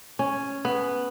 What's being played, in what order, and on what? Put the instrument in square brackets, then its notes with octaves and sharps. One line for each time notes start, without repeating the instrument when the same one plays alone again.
[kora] C#4
B3